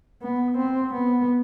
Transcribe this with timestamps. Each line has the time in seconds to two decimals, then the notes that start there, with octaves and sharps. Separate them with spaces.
0.22 B3
0.58 C4
0.93 B3